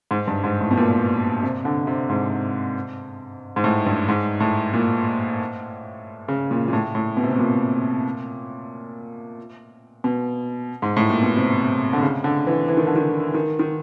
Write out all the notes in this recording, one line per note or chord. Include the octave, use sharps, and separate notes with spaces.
G#2
G2
G#2
A2
B2
A#2
C3
D3
C3
G#2
G#2
A2
G2
G#2
A2
A#2
C#3
A#2
A#2
A2
A2
B2
C3
B2
A#2
B2
G#2
A2
A#2
B2
C3
D3
C#3
D3
E3
E3
D#3
D3
D#3
D#3
D#3